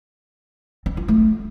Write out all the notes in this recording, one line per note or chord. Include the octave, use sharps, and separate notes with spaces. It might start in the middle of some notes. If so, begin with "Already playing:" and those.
C4
F4
A3